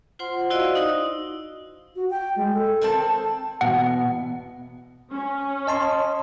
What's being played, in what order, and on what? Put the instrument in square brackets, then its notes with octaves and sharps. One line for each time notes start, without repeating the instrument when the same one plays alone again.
[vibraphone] F4 C5 F#5 C6
E4 F#4 C5 D5 D#5 F5
D#4 E4
[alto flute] F#4
G5
G#3
A4
[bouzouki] D#3 C4 A5
[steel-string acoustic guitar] E2 B2 [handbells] F#5
[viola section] C#4
[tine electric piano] D#5 A5 C6